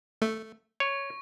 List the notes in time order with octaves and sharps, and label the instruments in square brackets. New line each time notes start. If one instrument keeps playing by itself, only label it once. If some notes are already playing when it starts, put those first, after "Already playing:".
[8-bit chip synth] A3
[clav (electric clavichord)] C#5 [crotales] C#6